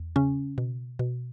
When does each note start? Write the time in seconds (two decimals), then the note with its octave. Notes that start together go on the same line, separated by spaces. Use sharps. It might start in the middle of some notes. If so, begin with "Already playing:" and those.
Already playing: E2
0.16 C#3 C#4
0.58 B2
0.99 B2